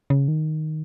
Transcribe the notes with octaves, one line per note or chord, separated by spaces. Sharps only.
C#3
D#3